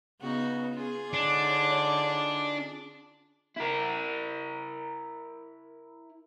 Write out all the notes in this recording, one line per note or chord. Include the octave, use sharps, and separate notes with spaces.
C#3 B3 D#4 F#4
C#4 F4 G#4
D3 D4 D#4 C#5 D5
E4 A#4